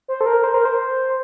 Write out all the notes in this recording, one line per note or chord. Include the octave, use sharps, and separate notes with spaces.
C5
A4
A#4
C5
A#4
C5